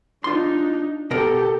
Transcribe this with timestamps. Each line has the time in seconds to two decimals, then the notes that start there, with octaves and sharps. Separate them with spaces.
0.24 D4 D#4 F4 C6
1.11 B2 G4 A4 A#4